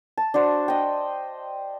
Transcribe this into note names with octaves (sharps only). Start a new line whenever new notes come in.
A5
D4 F#4 C5
D#5 G5